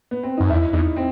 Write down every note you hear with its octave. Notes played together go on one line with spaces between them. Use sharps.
B3
C4
F#2 D#4
E2 E4
E2 D#4
C4